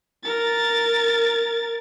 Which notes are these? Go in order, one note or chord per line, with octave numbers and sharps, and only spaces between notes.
A#4 A6